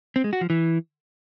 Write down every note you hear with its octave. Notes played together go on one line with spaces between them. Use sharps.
C4
G#3
F#4
F3
E3